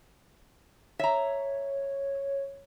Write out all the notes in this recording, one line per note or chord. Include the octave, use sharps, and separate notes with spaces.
C#5 E5 A#5